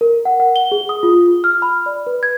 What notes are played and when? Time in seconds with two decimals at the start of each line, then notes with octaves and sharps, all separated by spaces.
0.01 A#4
0.25 F#5
0.40 F#5
0.56 G7
0.72 G#4
0.89 D#6
1.03 F4
1.44 F6
1.62 B5
1.86 D5
2.07 B4
2.23 G#6